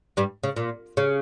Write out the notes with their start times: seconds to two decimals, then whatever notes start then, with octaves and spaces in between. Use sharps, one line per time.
0.17 G2 G3
0.43 C#3
0.56 A#2
0.97 C#3